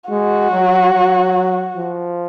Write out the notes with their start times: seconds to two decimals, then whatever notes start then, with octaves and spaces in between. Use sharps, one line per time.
0.10 G#3 F#4
0.52 F#3
0.93 F#3
1.76 F3